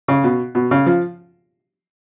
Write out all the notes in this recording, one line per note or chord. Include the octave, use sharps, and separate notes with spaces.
C#3
B2
B2
C#3
F3